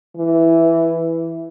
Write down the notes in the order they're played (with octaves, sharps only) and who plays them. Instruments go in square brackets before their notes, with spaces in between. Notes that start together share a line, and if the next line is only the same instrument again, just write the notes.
[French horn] E3